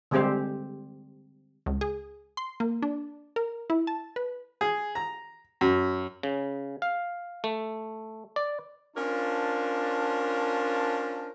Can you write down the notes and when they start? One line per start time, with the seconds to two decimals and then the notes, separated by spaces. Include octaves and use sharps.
0.11 D3 G3 G#3 C4 G4 C5
1.66 C#2
1.81 G#4
2.37 C6
2.60 A#3
2.82 D4
3.36 A#4
3.70 E4
3.87 A5
4.16 B4
4.61 G#4
4.95 A#5
5.61 F#2
6.23 C#3
6.82 F5
7.44 A3
8.36 D5
8.97 C#4 D4 F4 A#4 C5 A5